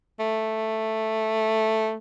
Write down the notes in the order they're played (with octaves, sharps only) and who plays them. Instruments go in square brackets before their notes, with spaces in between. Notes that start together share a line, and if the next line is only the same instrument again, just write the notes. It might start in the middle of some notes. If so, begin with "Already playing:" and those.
[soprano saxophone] A3